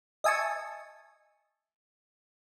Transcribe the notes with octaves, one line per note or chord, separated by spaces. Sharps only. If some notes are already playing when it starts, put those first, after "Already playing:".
D#5 E5 G#5 A5 C#6